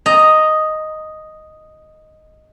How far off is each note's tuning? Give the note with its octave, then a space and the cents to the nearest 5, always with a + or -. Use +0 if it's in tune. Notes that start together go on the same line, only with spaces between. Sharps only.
D#5 +0 A#5 +0